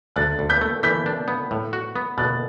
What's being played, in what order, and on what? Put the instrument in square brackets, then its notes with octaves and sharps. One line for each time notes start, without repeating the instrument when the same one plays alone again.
[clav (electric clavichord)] D2 [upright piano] F#6 A6
[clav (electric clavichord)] D2
[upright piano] G6 B6
[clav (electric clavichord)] A3
[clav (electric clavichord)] E3 [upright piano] G6 B6
[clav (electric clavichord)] D4
B3
A2
F#4
B3
[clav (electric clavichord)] B2 [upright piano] F#6 A6